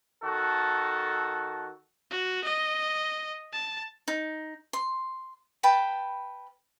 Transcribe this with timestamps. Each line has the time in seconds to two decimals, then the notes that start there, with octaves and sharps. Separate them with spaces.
0.23 D#3 F#4 A4
2.11 F#4
2.44 D#5
3.53 A5
4.08 D#4
4.73 C6
5.63 B4 G5 A5 B5